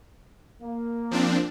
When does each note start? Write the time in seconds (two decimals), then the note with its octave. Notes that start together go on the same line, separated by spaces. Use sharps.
0.62 A#3
1.11 F3 C4 D4